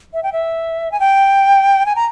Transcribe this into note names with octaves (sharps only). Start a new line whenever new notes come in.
E5
G5
E5
G#5
G5
G#5
A#5